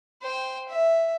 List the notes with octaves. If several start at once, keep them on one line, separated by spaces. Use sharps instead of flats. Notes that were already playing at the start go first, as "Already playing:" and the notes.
C5 G5
E5